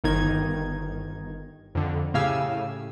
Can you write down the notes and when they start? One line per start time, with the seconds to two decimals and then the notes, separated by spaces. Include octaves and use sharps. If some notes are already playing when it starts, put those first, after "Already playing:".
0.04 G1 D#3 D#4 G#6
1.75 F2 D3
2.14 A2 C#3 G4 F5 G#5 E6